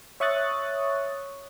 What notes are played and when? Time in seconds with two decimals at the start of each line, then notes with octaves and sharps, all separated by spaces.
0.20 C#5 E5 C#6 D#6 F#6 A6